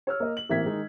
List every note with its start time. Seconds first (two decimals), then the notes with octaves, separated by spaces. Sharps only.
0.07 C#5 E6 F6
0.20 A#3 D#5
0.37 F#7
0.49 A1 A#3 C4 E5 G#6 B6
0.66 D#3 G#3 D#4